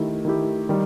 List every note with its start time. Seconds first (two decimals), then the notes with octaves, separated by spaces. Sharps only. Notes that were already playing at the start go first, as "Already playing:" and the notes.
Already playing: D#3 A3 E4 G4
0.25 D#3 A3 E4 G4
0.69 D#3 G3